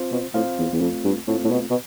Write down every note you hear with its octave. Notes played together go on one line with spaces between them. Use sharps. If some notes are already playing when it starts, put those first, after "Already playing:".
Already playing: C4 F4 C5
B2
A2 C4 F4 C5 F5
E2
E2
F2 A3 C4 F4
G2
A2 A3 C4 F4
A2
B2
B2